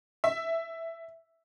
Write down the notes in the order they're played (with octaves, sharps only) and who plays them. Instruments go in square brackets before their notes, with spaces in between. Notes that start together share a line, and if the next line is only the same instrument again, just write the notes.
[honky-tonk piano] E5